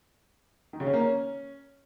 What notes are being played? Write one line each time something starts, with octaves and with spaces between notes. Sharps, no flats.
D#3
C#3
C#4
A#3
C#4